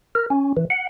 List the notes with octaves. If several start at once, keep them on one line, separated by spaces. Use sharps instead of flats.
A#4
C#4
E3
F#5